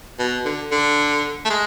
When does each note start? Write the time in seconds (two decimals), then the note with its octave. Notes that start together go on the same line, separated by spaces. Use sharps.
0.19 B2
0.45 D3
0.72 D3
1.45 A3
1.50 G#3